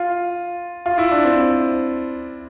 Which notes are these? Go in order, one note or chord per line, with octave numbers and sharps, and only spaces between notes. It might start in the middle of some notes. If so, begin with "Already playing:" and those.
Already playing: F4
F4
E4
D4
C4